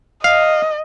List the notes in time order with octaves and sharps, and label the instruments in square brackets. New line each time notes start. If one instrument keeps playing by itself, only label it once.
[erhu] D#5 [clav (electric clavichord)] F5